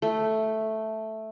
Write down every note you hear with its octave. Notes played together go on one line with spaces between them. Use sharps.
A3